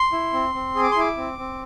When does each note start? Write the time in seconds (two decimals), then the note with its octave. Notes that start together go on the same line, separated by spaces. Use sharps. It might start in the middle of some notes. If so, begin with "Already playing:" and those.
Already playing: C6
0.13 E4
0.33 C4
0.54 C4
0.75 G#4
0.83 D6
0.92 C6
0.96 E4 D6
1.17 C4
1.38 C4